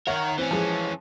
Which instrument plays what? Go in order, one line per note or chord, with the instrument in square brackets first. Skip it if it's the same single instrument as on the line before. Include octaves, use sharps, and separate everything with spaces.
[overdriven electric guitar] D#3 A#4 [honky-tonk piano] C#5 E5 F#5
[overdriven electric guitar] E3 C#4 [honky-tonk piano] C4
[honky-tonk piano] F3 G#3